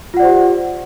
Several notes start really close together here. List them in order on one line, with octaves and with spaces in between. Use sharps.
F4 F#5 D5 C5 G4